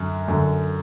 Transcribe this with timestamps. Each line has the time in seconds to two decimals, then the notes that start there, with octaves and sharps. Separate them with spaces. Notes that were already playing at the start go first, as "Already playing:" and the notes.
Already playing: F#2 D3
0.28 F#2 D3